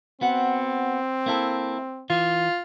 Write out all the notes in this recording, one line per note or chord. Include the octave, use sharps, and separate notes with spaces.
B3 C4 F#4 F#5
A#3 E4 A4
E3 F4